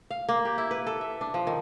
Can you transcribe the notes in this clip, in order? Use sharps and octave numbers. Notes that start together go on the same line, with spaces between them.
F5
A#3
G4
E4
B4
A4
E5
D4
F3
D#3